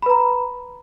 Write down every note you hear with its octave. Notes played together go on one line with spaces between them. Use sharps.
B4 A#5 B5